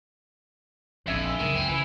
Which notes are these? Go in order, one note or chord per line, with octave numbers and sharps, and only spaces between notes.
A#1 F2 D4 E5 G#5
C#2 F#2 D#3
C4
C#3 E3